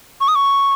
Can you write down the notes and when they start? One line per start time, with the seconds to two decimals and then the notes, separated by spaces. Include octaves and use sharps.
0.21 C#6
0.28 D#6
0.35 C#6